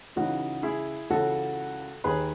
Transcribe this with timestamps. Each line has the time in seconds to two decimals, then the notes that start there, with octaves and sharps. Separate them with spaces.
0.16 C#2 C#3 E3 D#4 F#4
0.63 E4 G#4
1.10 C#2 C#3 E3 F#4 A4
2.04 D#2 D#3 G#4 B4